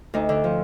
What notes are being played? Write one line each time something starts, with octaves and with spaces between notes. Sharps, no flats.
D2 D#4
D3
F3